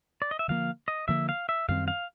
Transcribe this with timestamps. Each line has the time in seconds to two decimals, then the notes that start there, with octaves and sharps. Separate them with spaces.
0.22 D5
0.31 D#5
0.39 E5
0.48 D3 F3 A#3 F5
0.88 D#5
1.08 D3 F3 A#3 E5
1.29 F5
1.49 E5
1.68 F#2 D#3 G3 C4 F5
1.88 F5